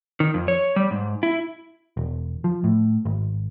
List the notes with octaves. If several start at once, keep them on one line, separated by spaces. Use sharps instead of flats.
D#3
F2
C#5
G3
G#2
E4
E1
F3
A2
G#1